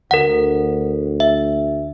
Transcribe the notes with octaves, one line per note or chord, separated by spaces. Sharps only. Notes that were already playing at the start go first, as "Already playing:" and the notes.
D2 A#4 F#5
E5